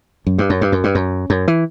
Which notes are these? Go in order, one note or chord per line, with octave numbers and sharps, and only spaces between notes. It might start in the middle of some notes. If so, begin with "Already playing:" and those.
F#2
G2
F#2
G2
F#2
G2
F#2
F#2
E3